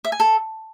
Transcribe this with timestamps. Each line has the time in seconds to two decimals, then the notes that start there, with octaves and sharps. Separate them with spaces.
0.05 E5
0.12 G#5
0.20 A4